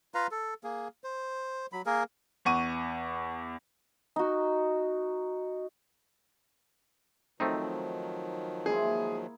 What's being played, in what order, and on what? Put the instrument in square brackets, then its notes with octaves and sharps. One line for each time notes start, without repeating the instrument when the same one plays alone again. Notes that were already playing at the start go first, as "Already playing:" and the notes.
[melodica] F4 B4 F5 A#5
A4
A#3 G#4
C5
F#3 B5
A#3 G#4 A#4
[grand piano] E2 F#5 C#6 D#7
[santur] D#4 F#4
[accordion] D#3 F3 F#3 [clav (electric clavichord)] A3 C4 D#4
[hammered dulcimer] G#3 A#3 E4 [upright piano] G#4